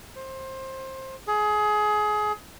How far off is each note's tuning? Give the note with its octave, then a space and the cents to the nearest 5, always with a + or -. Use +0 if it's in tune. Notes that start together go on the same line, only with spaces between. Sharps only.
C5 +20
G#4 +25